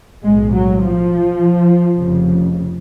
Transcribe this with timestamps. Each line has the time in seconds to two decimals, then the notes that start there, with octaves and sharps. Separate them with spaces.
0.24 B1 A2 G#3
0.53 F#3
0.82 F3
1.98 F1 F2 C#3